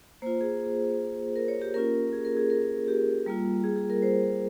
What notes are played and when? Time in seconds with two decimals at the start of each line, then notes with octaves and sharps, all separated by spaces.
0.22 A#3 F4 C5
0.41 G#4
1.36 A#4
1.48 C#5
1.62 G4
1.74 A#3 C#4 F4 A#4
2.13 G#4
2.25 A#4
2.37 G#4
2.50 A#4
2.88 G4
3.26 G3 A#3 F4
3.64 G#4
3.76 G#4
3.90 A#4
4.03 C5